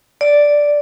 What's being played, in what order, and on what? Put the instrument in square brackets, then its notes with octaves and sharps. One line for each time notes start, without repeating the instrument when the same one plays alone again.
[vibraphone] D5